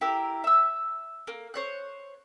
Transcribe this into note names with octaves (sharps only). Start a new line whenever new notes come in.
E4 G4 A#4 E6
E5 E6
A#3
C5 C#5 F#6